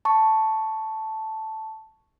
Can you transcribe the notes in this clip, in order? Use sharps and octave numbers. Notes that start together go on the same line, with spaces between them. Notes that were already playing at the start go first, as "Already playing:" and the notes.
A5 C#6